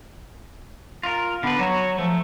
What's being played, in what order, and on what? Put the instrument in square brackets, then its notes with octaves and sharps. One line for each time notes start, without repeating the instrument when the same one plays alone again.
[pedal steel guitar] F4 A#4
[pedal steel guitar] D3 B4 [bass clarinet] B3
[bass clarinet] F#3 [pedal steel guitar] F#4 C#5
[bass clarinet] F3 [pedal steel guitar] A3